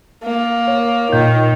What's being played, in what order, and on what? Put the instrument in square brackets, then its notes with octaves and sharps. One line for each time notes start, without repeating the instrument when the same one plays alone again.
[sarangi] A#3
[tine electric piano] C#5
[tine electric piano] A#2 G6 [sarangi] D#3